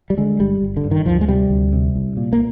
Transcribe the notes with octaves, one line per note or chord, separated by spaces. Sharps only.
G3
D3 G#3
G1 G3
G1
D3
G2
D#3
D2 F3
G#3
C3 G3
D2
C3
C2
A#2
A#3